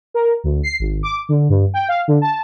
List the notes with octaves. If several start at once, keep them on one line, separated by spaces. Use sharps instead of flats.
A#4
D2
C7
G#1
D6
D3
G2
G5
F5
D3
A5